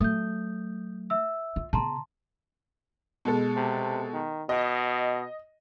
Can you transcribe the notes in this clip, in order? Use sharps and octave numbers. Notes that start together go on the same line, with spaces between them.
F#3 A3 D#6 G6
E5 E6
F4
C#3 B3 A5 A#5 C6
B2 G#3 A4
C3
D#3
B2 D#5